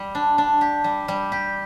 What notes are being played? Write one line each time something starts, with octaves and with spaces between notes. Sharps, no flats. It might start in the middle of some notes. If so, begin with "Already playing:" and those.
Already playing: G3
D4
D4
G4
G3
G3
G4